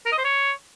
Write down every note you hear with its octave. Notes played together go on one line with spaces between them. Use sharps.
A#4
D#5
C5
C#5